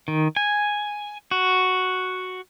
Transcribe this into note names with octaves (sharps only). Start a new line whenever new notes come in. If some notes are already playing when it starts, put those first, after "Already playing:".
D#3
G#5
F#4